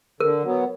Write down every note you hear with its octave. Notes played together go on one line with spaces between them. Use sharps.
D3 A#4
F#3 B3